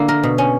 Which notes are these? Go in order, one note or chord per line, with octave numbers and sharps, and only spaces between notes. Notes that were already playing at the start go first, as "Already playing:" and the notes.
Already playing: D3 A#3 E4
A#4
B2
C#4